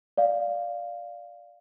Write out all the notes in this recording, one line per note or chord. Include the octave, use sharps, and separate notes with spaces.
D5 F5